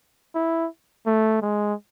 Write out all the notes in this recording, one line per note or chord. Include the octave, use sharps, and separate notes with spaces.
E4
A3
G#3